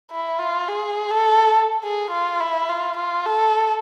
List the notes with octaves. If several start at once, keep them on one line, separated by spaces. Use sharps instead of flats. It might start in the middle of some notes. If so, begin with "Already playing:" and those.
E4
F4
G#4
A4
G#4
F4
E4
F4
F4
A4